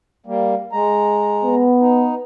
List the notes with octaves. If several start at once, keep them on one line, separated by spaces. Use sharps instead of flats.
G3 A#3
G#3 A#5
B3
D#4